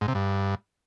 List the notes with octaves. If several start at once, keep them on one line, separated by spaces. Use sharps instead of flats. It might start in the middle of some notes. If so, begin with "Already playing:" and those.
G#2
C3
G2